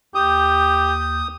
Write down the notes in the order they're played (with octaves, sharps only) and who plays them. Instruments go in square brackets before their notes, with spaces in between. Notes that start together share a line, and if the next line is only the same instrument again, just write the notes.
[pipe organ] D#2 G6 [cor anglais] G4 [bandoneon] D#6